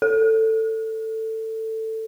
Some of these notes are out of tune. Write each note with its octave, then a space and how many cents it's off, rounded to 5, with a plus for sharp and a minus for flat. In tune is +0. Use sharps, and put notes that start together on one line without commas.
A4 +15